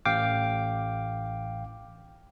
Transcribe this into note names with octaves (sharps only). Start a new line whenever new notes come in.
A1 F5 G5 D6